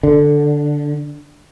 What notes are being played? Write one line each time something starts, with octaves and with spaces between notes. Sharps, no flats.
D3